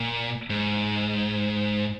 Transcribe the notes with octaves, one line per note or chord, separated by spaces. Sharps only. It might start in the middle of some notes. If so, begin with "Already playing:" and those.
Already playing: A#2
G#2